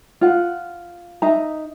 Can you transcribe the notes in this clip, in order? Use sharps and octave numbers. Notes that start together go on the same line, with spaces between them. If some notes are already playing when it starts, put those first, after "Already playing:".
F4 F#5
D#4 E5 A#5